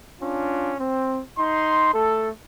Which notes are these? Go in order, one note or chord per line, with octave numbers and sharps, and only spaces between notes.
C#4 D4 F4
C4
D#4 C6
A3 A4